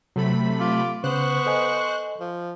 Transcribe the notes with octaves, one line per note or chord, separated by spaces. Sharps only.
C3 F#3 A3 B5
F4 D6
C#3 B3 C5 C#6 F#6
A4 D#5 G#5
F3